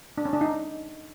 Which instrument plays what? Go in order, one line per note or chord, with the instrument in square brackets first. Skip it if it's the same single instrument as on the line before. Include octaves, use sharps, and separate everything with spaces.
[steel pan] D4
C#4
D4
D#4